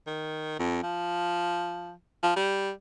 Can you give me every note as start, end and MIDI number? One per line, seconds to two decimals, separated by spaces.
0.07 0.56 51
0.59 0.81 41
0.83 1.93 53
2.23 2.32 53
2.36 2.71 55